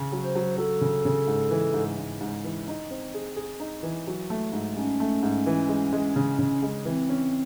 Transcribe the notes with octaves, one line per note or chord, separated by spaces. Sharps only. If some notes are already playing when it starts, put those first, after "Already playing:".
Already playing: C#3
F#3
C5
F#3
F#3 A4
C#3
C#3
G#2
E3
G#2
G#2
G#2
E3
D#4
C4
G#4
G#4
D#4
E3
F#3
A3
G#2
G#2 C#4
A3
G#2
E3
G#3
G#3
C#3
C#3
G#3
E3 C4
C#4